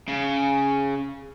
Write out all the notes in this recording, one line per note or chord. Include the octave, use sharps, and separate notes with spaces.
C#3